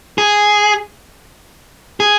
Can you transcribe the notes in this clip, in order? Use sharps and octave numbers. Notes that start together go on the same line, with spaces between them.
G#4
G#4